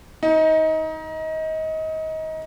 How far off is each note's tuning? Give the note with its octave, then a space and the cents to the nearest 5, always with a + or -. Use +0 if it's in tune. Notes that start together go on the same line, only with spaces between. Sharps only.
D#4 +25